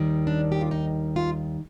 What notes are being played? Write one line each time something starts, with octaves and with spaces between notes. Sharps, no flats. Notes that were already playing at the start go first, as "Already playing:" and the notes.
Already playing: D#2 D#3 G3
D4
G4
F4
D#4
F4